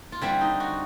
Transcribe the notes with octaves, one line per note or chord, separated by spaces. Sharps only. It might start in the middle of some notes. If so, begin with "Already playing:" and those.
F4
D3 G3 C4 E4
D#4
F#4